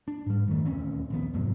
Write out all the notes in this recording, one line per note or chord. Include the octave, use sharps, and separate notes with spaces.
D4
G#2 G3
F2 D#3 A3
D#1 D2 C4 C#4
A#1 D#2 C#3 B3
F2 G#2 C3 F#3